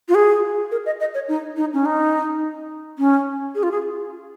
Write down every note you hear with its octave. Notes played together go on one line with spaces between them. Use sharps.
F4
G#4
A#4
D#5
D#5
C#5
D#4
D#4
C#4
D#4
C#4
G#4
F4
G#4